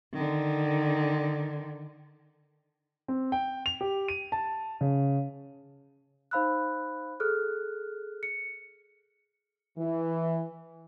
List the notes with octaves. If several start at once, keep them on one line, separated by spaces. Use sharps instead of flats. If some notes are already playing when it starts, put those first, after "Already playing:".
D3 D#3
C4
G5
F7
G4
D#7
A5
C#3
D#4 C5 F5 B5 E6 F#6
G#4 A4 F6 F#6
C#7
E3